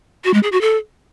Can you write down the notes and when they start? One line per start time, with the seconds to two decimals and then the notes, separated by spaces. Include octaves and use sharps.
0.25 F#4
0.34 G#3
0.43 G#4
0.52 F#4
0.61 A4